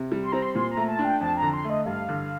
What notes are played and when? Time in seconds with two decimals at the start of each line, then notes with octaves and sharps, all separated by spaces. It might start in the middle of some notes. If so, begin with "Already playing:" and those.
Already playing: C3
0.12 G3
0.22 C6
0.32 C4 A#5
0.42 C6
0.55 A#2 C6
0.71 A#5
0.77 A3
0.88 A5
0.99 D4
1.05 G5
1.20 F2 A5
1.37 D3 A#5
1.54 C6
1.64 A3
1.70 D#5
1.86 G2 F5
2.09 D3